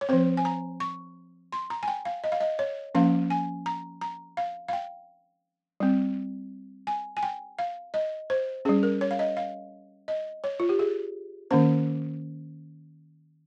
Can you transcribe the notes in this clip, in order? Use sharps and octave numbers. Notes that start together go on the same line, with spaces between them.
C#5
F3 C4 C5
G#5
A#5
C#6
C6
A#5
G#5
G5
F5
D#5
F5
D#5
C#5
F3 A#3 C#4 F5
G#5
A#5
A#5
F5
F5
G5
G3 C4
G#5
G#5
G5
F5
D#5
C5
G3 C#4 G#4
A#4
C#5
F5
D#5
F5
D#5
C#5
F4
G4
G#4
D#3 A#3 C#4 C5